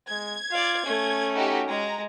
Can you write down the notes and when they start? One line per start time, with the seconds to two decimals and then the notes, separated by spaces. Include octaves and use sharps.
0.10 G#3 G#6
0.51 F4 D5 F5
0.86 A3 C#4 G#5
1.35 D#4 F#4 G4
1.68 G#3 A#5